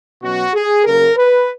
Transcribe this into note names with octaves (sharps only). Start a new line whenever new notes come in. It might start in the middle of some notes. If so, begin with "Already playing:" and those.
B2 F#3 C#4 F#4
G#4
C#3 F#3 A#3 A#4
B4